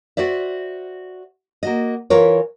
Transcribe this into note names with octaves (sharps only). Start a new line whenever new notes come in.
F#4 C5 D5 E5
A#3 F#4 D#5
E3 F4 A#4 B4 C#5